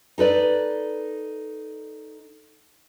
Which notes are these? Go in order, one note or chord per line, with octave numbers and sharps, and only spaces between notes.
D#4 A4 B4 D5